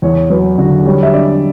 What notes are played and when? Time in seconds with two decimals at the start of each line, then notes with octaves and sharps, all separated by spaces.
0.02 E2 C#5
0.30 F#3 B4
0.58 D3 F#4
0.86 G3 C#5
1.03 E5
1.14 D4 D5